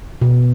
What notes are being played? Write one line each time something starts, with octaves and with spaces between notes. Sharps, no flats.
B2